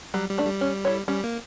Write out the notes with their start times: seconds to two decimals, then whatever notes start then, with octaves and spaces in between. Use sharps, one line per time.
0.14 F#3 G3
0.30 G3
0.38 A3 D4
0.46 G3
0.61 C#4
0.85 E4 A4 C#5
1.08 G3 C#4
1.24 A#3